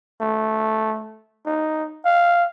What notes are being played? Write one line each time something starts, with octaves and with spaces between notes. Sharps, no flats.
A3
D#4
F5